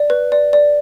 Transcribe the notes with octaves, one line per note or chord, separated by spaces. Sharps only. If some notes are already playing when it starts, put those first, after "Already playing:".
Already playing: D5
B4
D5
D5